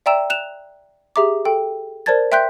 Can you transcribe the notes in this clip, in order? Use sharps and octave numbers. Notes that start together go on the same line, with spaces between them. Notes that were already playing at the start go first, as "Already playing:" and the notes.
D5 E5 G5 A#5 E6 E7
F#6 E7 F7
G4 G#4 E5 A#5 D6
A4 G5
A#4 C5 D5 A5 G#6 A6
E5 G5 C6 F#6 G6 B6